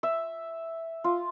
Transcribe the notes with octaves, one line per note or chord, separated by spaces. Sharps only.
E5
F4